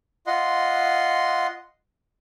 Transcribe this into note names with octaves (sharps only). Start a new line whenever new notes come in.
F4 D#5 F#5 C6